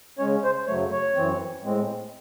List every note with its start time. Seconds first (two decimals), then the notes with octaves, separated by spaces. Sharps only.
0.18 C#3 G#3 C#4 C#5
0.44 C5
0.67 F#2 C#3 F#3 A3 C#5
0.91 C#5
1.15 F#2 E3 C4
1.63 A2 G#3 C4